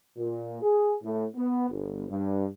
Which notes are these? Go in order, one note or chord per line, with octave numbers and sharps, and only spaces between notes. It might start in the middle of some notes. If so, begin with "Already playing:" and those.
A#2
G#4
A2
B3
G1
G2